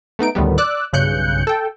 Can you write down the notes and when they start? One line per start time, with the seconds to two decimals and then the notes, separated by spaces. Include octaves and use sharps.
0.19 A3 B3 D#4 D7
0.35 D2 A2 D#3 G3 B3
0.58 D5 D6 E6 F#6
0.93 B1 G2 C#3 F#6 G6 C#7
1.47 A4 G5